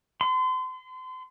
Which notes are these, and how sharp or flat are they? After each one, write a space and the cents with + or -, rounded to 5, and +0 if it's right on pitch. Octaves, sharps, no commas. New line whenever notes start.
C6 -35